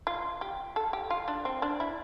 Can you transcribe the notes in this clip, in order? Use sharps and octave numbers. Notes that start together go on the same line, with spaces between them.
F4
G4
A4
G4
F4
D4
C4
D4
E4